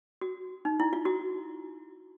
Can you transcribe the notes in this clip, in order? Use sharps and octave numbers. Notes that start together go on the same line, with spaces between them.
F#4
D#4
E4
F4
F#4